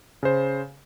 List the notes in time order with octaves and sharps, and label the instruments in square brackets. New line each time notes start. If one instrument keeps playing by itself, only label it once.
[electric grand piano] C#3 C5